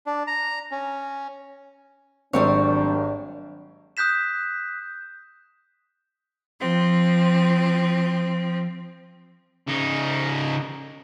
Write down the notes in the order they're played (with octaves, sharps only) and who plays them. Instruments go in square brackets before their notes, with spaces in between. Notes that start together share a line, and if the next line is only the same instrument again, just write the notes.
[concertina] D4
A#5
C#4
[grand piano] G#1 [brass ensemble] F#3 A#3 D4 [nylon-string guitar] G3 C4 C#5
[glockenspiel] D#6 F#6 G6 B6 E7
[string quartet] F3 C4
[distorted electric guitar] C#3 D#4